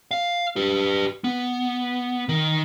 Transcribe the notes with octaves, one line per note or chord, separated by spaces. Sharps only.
F5
G4 B4
B3
D#3